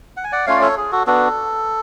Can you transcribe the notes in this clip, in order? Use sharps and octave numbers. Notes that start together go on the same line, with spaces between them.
F#5
G#5
D5 F#5
A3 C#4 F4 C#5 F5
D5
A4 C#5
G#4
F#4 A4
B3 D4 F#4 A4